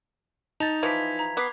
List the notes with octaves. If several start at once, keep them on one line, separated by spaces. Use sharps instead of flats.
D#4 A5 A6 F7
E3 F3 G#6 B6
A#5
B3 D6 B6 C7